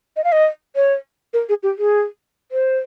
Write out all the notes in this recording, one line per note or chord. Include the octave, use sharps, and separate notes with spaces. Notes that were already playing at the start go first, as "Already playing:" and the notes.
D#5
F5
D#5
C#5
A#4
G#4
G4
G#4
C5